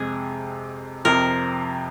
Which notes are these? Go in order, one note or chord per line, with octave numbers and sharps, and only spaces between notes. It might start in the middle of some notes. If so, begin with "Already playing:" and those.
Already playing: F2 C3 G#3 G#4
F2 C3 F3 A#4